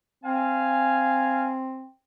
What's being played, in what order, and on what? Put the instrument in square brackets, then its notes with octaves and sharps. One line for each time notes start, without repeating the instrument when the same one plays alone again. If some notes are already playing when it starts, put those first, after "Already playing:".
[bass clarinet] C4 [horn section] F5 G#5